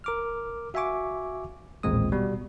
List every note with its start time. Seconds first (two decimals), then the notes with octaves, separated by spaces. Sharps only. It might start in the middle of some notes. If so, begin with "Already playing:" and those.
0.04 A#4 D6 F6
0.74 F#4 E5 F5 G#5 C#6 D6
1.83 A1 D#2 A#2 G#3 C4 D#6
2.12 B2 G3